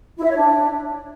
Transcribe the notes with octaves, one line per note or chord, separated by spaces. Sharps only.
E4
E5
C#5
D4